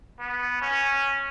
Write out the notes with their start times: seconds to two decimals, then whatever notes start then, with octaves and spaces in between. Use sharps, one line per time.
0.19 B3
0.62 C#4